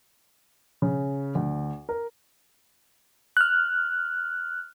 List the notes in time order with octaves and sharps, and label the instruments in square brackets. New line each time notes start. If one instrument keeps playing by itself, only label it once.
[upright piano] C#3
D2
A#4
[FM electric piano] F6 F#6